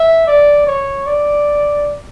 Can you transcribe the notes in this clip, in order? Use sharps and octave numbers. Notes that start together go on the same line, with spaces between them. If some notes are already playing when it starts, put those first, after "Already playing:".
Already playing: E5
D5
C#5
D5